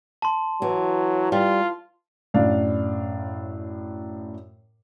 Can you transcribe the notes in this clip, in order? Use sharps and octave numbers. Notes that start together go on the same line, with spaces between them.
A5 C6
E3 F#3
G3 F4
F#2 A2 D4 F5